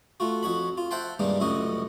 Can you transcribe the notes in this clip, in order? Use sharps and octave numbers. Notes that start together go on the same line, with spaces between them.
A3 F4 F#4
F2 F#4 C#5 B5
F4
C5 E5 F#5 G5 A5 C6
G2 C3 D#3 G3 G#3 A#3
C#2 F#2 A2 C3 F#4 D#5